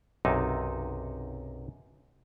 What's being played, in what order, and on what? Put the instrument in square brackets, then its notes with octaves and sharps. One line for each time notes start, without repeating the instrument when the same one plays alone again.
[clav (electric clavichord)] B1 F#2 C3 D#4